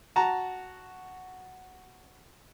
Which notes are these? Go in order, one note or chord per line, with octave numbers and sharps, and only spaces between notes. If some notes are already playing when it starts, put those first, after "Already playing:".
F#4 A5 A#5